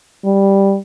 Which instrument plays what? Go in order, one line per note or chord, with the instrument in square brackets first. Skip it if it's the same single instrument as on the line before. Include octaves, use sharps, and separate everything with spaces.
[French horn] G3